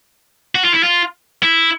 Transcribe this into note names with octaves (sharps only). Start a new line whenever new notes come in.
F#4
F4
E4
F4
E4